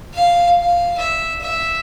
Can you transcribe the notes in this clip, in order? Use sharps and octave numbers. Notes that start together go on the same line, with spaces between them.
F5
F5
E5
E5